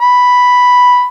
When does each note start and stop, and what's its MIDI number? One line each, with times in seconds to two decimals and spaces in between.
0.01 1.07 83